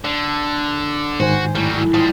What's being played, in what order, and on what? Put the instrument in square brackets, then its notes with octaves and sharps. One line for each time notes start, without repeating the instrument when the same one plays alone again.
[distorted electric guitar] D3 [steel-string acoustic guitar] D4
[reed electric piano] G#2 D#3 G#5 [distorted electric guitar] F#4 [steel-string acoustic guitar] C5
[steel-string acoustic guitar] A2 [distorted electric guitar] F#3 G3
[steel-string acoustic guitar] F3 [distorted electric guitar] G3 G#3